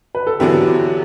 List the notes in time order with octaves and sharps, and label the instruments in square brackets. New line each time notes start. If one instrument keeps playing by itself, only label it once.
[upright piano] B4
A4
[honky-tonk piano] E2 D3 F#3 B3 D4 [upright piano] E4 G4